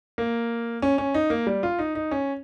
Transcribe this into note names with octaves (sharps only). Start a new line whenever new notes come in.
A#3
C#4
C#4
D#4
A#3
G3
F4
D#4
D#4
C#4